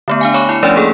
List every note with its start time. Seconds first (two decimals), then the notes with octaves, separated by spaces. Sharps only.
0.08 D3 A3 B3
0.21 D4 F5 G#5
0.34 C#5 G#5 B5 C#6 D6 C#7
0.49 E4
0.63 F3 A3 C#4 D4 C#5 D5
0.76 A#3 G#4 A4